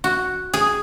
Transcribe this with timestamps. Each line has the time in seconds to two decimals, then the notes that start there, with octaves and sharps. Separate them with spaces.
0.04 F#4
0.53 G#4